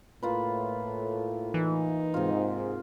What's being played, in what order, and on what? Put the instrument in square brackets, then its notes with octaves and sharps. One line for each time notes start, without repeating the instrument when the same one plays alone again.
[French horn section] A2 [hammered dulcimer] A#3 F4 B4
[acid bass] E3 [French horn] D#4
[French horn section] G#2 [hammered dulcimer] C3 F4